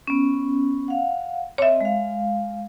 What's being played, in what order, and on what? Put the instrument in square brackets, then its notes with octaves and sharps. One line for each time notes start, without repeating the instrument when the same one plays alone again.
[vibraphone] B3 C#4
F5 F#5
[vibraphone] C4 D#5 [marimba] C#5 E5
[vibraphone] G#3 F5